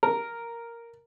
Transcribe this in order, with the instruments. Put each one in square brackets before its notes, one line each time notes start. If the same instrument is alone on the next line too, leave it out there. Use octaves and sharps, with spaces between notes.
[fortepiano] A#4